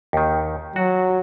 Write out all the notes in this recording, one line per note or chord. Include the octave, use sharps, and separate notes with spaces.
D#2 D#3
F#3 F#4